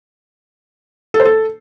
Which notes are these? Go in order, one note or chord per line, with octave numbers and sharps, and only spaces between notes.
A4
C5
A4